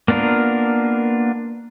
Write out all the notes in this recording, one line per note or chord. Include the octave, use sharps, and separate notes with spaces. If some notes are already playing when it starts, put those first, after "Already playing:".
A#3 B3 D4 F4 A#4